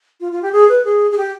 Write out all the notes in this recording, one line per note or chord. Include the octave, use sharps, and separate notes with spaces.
F4
F4
G4
G#4
B4
G#4
G#4
G4